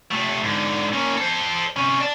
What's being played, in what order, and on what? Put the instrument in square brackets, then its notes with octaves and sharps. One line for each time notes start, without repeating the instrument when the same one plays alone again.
[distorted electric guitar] C3 A3
G#2 D3
A#3 C#4
A4 C5
C3 C#4
D5 A5